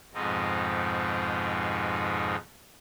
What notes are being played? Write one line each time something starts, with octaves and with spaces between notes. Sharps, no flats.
F2 G#2 B2 G#3 C4 D#4